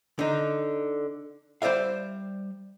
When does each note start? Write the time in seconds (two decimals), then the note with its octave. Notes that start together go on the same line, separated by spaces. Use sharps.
0.19 D3 D#4
1.62 G3 C5 D5 E5 F5